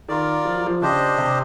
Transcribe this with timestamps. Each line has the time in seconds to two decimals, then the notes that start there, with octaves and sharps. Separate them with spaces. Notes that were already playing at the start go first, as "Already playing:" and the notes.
0.08 D#3 F4 A#4 D5
0.45 F3
0.56 F#3
0.66 F3
0.81 C#3 D4 G4 C5 D#5
1.18 C3